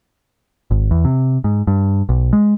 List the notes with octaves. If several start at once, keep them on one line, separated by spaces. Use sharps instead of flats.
G#1
E2
C3
G#2
G2
B1
G#3